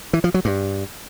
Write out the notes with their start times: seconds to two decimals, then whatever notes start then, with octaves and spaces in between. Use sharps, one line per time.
0.13 E3
0.24 F3
0.34 F#3
0.45 G2